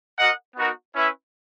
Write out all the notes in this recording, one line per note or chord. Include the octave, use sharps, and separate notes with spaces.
F#4 A#4 D#5 F#5
B3 D#4 F#4 A#4
C#4 E4 B4 E5